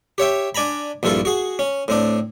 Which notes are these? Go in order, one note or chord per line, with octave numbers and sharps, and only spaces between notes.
G4 C#5 E5 G5
D4 D5 G#5 A#5 B5
A#1 G2 E4 F4 A4
F#4 G#4
C#4
A2 C4 D4